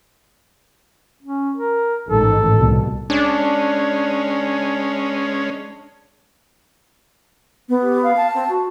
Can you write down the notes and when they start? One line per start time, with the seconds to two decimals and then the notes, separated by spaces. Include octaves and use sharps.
1.23 C#4
1.57 A#4
2.09 A1 G#2 D#3 A4
2.54 C2 B2
3.10 G#3 C#4 D4
7.69 B3
7.81 G4
8.02 F5
8.17 A5
8.34 C4
8.48 F#4